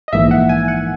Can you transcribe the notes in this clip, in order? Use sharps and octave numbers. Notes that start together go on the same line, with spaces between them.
D#5
A#1 G#2 E3 A#3 E5
F#5
G#5
F#5